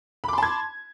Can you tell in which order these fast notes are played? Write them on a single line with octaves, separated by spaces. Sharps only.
B5 D6 C6 A5 G#6